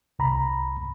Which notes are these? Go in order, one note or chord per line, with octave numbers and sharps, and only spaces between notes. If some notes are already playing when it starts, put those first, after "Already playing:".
C2 A#5 B5